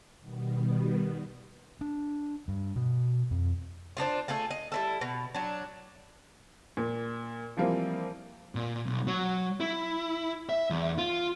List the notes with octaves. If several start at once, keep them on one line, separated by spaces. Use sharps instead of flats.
B2 D#3 G3 B3
D4
G2
B2
F2
C4 D4 D#4 F4
A3 F4 G#4 A4
D#5
G3 E4 A4
B2
F#3 D4
A#2
E3 F3 G3 A#3 C4 F4
A#2
B1
F#3
E4
E5
E2
F4